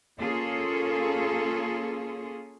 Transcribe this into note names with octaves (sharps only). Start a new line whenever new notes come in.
A#3 C#4 F4 G#4 A4